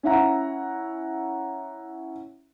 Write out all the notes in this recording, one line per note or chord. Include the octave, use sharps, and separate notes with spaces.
C#4 E4 E5 F#5 A#5